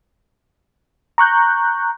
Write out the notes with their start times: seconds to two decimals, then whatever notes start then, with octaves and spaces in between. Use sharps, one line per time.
1.18 A#5 C#6 F#6 G6